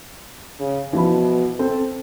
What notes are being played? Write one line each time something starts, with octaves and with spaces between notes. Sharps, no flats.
C#3
B2 E3 F3 B5
C4 A4